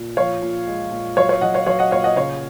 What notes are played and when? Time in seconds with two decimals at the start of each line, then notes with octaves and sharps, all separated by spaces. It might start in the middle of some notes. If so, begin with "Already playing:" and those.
Already playing: A#2
0.17 F3 C#5 F5
0.42 A#2
0.67 G#3
0.91 A#2
1.17 F#3 C#5 F5
1.29 C#5 F5
1.41 F#3 D#5 F#5
1.54 C#5 F5
1.66 F#3 C#5 F5
1.79 D#5 F#5
1.91 A#2 C#5 F5
2.04 D#5 F#5
2.16 C#3 C#5 F5